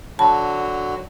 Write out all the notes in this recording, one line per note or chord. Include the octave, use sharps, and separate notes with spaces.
D3 F#3 F#4 A5 B5